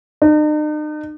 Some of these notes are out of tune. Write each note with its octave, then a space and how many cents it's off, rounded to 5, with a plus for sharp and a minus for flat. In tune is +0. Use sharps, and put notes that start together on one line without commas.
D#4 -45